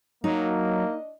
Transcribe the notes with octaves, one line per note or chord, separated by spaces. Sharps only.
F#3 A#3 D4 D#4 D#5